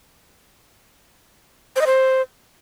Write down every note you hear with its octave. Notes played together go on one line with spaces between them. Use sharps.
C5
D#5
C5